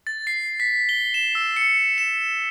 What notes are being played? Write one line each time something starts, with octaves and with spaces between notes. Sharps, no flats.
A6
C7
B6
G7
E7
E6
C#7
E7